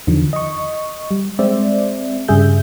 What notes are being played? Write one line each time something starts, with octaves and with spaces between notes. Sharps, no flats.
E2 D3 D#3 F3
D#5 C#6
G3
G#3 C4 C5 D5 E5
G2 C#3 G3 G#4 E5 G6